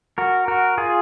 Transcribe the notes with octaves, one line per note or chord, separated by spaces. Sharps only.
F#4 A#4
F#4 A#4
F4 G#4